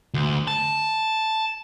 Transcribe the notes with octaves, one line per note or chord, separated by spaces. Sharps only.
D2
A5